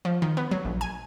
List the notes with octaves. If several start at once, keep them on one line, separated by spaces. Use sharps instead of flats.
F3
D#3
B3
F#3
A#1
G#5